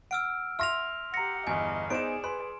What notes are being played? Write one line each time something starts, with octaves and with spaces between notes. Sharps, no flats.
F#5 E6 F6 D7
E5 C6 F6 A#6 F7
G4 F#5 A#5 A#6 C#7
G1 E2 D#5 G#5
B3 D#4 G#4 C5 D5 D7 E7
B4 C6